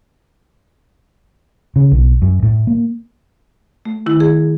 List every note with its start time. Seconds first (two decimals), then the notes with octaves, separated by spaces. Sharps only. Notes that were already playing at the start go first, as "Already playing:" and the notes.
1.76 C#3
1.91 B1
2.22 F#2
2.43 A2
2.67 A#3
3.85 A3
4.06 D#3 E4
4.20 G#4